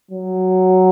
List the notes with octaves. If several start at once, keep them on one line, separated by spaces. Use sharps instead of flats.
F#3